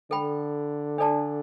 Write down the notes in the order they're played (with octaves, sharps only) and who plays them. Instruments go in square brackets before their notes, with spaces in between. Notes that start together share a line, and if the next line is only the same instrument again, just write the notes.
[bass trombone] D3 [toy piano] A4 G5 B5
[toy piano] D4 A4 D5 A5